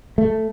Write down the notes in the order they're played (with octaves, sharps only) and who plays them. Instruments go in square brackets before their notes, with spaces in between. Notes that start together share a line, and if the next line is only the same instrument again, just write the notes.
[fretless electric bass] A3